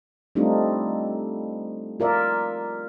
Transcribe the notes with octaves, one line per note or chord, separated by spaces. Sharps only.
G3 A3 C4 D4 D#4 F4
F4 A#4 D5 E5